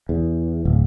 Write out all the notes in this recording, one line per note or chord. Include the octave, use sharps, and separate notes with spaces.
E2
D1